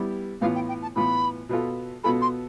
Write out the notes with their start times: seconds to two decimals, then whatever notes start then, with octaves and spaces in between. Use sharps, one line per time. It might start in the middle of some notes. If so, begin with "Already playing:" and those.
Already playing: G3 B3 E4 G4
0.41 A2 E3 B3 F4 F5
0.55 G5
0.68 G5
0.82 A5
0.96 A2 E3 B3 F4 B5
1.49 B2 B3 F4 A4
2.04 B2 B3 F4 A4 B5
2.22 C6